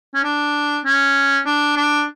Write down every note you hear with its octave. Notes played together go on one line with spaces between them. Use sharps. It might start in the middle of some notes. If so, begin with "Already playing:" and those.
C#4
D4
C#4
D4
D4